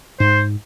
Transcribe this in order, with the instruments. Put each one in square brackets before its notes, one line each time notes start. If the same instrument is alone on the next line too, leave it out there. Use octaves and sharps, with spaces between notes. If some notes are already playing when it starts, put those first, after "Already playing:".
[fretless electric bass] G#2 [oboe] C5